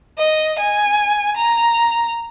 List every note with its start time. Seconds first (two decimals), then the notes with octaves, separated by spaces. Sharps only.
0.19 D#5
0.59 G#5
1.37 A#5